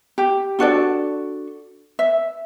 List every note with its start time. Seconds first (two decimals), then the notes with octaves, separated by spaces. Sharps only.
0.18 G4
0.59 D4 F#4 A4 D5
1.99 E5